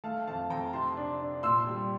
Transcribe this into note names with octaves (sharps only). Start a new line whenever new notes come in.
A3 F5 A5
F2 F5 A5
F2 G5 A#5
C3 A5 C6
D4
D4
A#2 C6 E6
G3